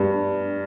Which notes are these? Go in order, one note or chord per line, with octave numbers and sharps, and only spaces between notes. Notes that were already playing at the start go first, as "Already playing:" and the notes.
Already playing: G2